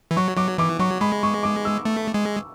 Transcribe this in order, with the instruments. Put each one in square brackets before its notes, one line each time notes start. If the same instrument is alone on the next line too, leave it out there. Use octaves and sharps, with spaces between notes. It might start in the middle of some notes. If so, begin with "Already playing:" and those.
[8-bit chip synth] E3
[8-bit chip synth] F#3 [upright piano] C#6
[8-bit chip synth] F#3 [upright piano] D6
[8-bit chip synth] E3 [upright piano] D6
[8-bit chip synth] F#3 [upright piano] C#6
[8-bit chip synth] G#3 [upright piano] B5
[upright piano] C#6
D6
E6
[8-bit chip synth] A3
G#3